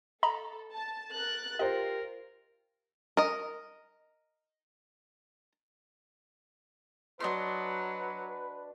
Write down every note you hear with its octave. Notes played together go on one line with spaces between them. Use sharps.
A4 D#5 A#5 B5
A5
A#4 F#6 A6
F4 G4 A#4 C5 D#5
A#4 D#5
F#3 D4 B4 D#5 C6